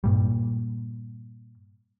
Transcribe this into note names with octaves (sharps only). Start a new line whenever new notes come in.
G2 A#2 G3